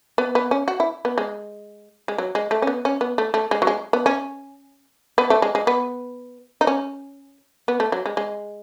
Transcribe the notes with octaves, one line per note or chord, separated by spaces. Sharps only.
B3
B3
C#4
F#4
E4
B3
G#3
G#3
F#3
G#3
A3
C#4
B3
C#4
B3
A3
A3
G#3
F#3
G#3
B3
C#4
B3
A3
G#3
G#3
B3
D#4
C#4
B3
A3
F#3
G#3
G#3